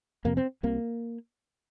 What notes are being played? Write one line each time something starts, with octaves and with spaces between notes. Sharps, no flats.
F2 C3 A#3
C4
C2 C3 A#3